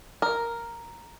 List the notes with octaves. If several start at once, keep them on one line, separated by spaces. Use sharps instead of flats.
A#4